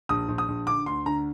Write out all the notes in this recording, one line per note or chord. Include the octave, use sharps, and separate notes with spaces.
A#1 D#6
A#1
D#6
A#1
D3 D6
D2 C6
D3 A#5